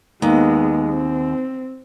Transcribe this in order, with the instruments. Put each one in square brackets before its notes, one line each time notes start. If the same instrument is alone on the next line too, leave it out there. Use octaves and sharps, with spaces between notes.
[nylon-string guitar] D#2 [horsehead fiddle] G#3 B3
[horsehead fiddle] C4